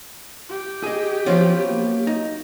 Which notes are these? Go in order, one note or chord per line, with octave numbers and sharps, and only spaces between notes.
G4
G#4 D#5
F3 F#3 B3 C#4 F4 C5
A#3
D#4